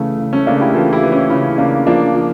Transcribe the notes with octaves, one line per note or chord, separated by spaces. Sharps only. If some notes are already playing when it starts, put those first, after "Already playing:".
Already playing: C#3 E3 A3
C#3
A3 C#4
C#3 A#3 D4
E4 G4
E3 F4 A4
E4 G4
E3
C#4 E4
C#3 C#4 E4
C#3 A#3 D4
F3 A#3 D4
F3